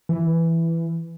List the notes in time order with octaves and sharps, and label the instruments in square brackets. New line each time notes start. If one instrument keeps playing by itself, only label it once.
[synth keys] E3